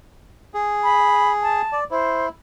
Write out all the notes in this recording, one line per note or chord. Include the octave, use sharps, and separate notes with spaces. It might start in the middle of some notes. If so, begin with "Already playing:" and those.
G#4
B5
A5
D5
E4 C5